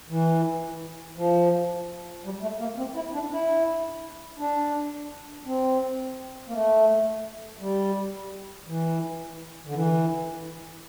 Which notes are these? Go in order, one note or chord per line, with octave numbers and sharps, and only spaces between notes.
E3
F3
G3
A3
A#3
C4
E4
D4
E4
D4
C4
A#3
A3
G3
E3
D3
E3